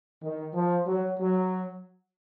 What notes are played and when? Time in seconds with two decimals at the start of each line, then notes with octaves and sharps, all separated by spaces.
0.22 D#3
0.53 F3
0.86 F#3
1.18 F#3